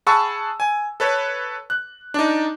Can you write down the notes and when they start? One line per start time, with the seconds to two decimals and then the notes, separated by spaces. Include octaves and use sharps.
0.07 G#4 F#5 A5 B5 C#6 E6
0.60 G#5
1.00 A4 B4 C#5
1.70 F#6
2.14 D4 D#4